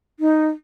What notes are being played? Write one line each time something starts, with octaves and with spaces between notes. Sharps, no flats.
D#4